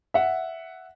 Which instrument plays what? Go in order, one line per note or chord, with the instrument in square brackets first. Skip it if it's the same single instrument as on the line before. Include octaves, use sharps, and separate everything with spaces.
[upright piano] E5 F#5